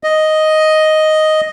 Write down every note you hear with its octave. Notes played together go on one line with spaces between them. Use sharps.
D#5